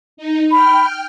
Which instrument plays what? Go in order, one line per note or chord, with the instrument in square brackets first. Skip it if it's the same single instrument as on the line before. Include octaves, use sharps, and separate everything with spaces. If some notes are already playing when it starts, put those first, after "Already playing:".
[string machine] D#4
[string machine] G5 F6 [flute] B5